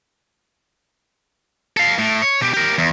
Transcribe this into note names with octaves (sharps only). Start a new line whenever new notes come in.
A4 F5
A2
C#5
B2 G4
G4 A#4
E2